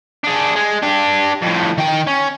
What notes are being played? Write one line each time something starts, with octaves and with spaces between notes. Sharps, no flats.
D4 G#4
G#3
D4 G4
F2 A2
D#3 G5
C#4